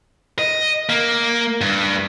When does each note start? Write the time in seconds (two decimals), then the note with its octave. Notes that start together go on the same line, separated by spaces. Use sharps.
0.39 D#5
0.89 A#3
1.61 G2